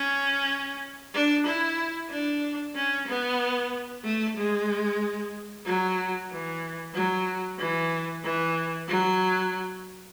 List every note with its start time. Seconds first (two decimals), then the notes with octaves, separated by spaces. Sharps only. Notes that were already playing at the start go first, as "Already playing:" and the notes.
Already playing: C#4
1.14 D4
1.46 E4
2.10 D4
2.75 C#4
3.08 B3
4.04 A3
4.37 G#3
5.65 F#3
6.30 E3
6.94 F#3
7.58 E3
8.24 E3
8.88 F#3